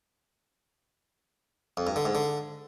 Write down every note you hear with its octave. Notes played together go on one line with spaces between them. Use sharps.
F2
G2
D3
G#2
D3